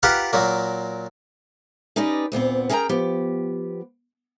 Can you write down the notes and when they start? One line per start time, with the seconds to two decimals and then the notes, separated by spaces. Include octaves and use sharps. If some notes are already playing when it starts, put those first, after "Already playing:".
0.03 F4 G4 A#4 B4 F5 F#5
0.33 A#2 F#3 A#3
1.96 C#4 D#4 G4 B4 D5 D#5
2.32 D2 A#2 B3 C4
2.70 C#4 G#4 A#4 C#5 G5 A#5
2.89 F3 B3 G4